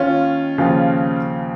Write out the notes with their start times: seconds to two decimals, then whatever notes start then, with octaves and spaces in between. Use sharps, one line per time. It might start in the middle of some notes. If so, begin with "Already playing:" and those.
Already playing: D#2 D#3 C#4 F4
0.58 D#2 C#3 F3